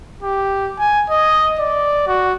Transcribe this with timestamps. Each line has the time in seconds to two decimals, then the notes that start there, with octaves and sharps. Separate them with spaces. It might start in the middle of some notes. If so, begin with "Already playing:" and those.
0.23 G4
0.79 G#5
1.10 D#5
1.59 D5
2.07 F#4